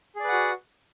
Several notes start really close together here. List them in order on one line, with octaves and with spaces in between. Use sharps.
G#4 D5 B4 F#5 F#4